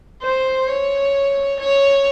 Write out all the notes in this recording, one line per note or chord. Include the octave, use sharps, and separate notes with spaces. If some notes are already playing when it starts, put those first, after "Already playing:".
C5
C#5
C#5